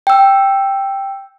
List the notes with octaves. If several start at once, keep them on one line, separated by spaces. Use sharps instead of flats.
G5 E6